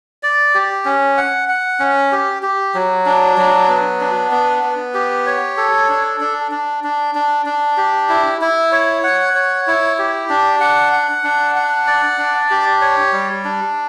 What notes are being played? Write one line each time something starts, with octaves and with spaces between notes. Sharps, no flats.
D5
G4
C#4
F#5
F#5
C#4
G4
G4
F#3
D4
F#3
B3
D4
B3
B3
G4
C#5
A4
D4
D4
D4
D4
D4
D4
G4
E4
E4
C#5
F#5
C#5
E4
G4
D4
F#5
F#5
D4
F#5
D5
D4
G4
C#5
G3
D4